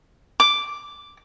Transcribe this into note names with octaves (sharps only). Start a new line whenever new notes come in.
D6